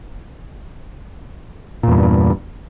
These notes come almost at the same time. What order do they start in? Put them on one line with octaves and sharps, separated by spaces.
A#2 E2 G2